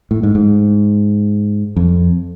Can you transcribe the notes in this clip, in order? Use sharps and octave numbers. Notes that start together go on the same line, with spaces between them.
A2
G#2
G#2
F2